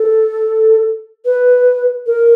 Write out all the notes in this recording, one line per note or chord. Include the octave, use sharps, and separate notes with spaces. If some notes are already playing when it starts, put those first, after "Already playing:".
Already playing: A4
B4
A#4